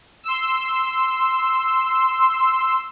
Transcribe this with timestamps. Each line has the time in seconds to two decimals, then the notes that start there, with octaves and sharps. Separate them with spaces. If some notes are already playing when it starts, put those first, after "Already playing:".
0.24 C6 E6